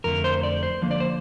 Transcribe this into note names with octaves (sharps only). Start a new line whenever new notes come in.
F2 D3 A3 A#4
C5
D5
C5
D3 F3 A#3
D5
C5